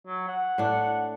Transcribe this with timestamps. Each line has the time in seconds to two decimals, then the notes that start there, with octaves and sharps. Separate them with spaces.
0.07 F#3
0.28 F#5
0.58 A2 D4